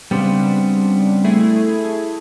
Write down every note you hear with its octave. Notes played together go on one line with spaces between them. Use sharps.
C#3 G3 B3 C4 D4
A3 E4 G#4